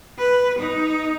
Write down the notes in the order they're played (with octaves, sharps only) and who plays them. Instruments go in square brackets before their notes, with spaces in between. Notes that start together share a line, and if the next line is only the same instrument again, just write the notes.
[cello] B4
D#4